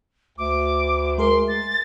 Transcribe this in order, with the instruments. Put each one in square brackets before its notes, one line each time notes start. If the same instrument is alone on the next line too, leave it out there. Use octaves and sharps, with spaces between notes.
[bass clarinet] D2 [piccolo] D6
[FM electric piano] G#3 G#4 A#4 [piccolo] C6
[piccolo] A6